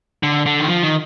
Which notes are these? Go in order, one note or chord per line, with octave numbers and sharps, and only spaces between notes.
D3
D3
D#3
F3
D#3